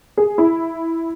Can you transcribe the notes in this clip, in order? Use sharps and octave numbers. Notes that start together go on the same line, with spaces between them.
G#4
E4